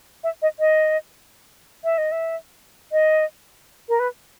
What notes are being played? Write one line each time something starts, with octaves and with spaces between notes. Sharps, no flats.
E5
D#5
D#5
E5
D#5
E5
D#5
A#4
B4